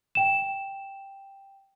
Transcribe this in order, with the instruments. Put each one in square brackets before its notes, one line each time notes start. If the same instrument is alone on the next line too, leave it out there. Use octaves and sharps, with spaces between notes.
[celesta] G5 E7